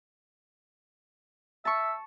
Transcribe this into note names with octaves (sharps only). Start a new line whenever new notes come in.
E5 A5 C#6